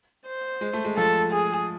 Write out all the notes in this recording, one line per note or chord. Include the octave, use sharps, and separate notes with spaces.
C5
G#3
A3
G#3
F3 A4
G#4